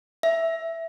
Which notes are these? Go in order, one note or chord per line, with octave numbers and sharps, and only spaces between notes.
E5